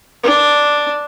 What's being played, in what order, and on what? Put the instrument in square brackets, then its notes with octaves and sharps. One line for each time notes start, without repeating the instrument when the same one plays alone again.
[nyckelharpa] D4